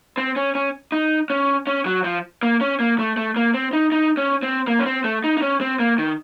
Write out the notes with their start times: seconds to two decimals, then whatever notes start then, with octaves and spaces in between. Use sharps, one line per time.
0.18 C4
0.36 C#4
0.55 C#4
0.92 D#4
1.30 C#4
1.67 C#4
1.86 F#3
2.04 F3
2.43 A#3
2.61 C#4
2.80 A#3
2.99 A3
3.17 A3
3.36 A#3
3.54 C4
3.73 D#4
3.92 D#4
4.17 C#4
4.43 C4
4.67 A#3
4.79 C#4
4.86 C4
5.04 A3
5.24 D#4
5.37 D#4
5.42 C#4
5.61 C4
5.79 A#3
5.98 D#3